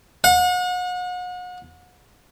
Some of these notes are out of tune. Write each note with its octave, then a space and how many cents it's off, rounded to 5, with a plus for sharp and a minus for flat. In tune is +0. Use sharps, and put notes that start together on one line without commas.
F#5 -40